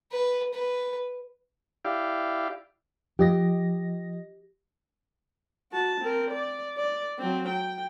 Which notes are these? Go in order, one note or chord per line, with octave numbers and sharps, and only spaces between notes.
B4
B4
E4 G4 D5 F5
F3 G4 D#5 A#6
F#4 A5
C4 A#4
D5
D5
F#3 C4
G5